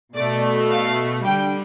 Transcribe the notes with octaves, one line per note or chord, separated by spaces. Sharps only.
B2 A3 D5
F5
D3 G3 G5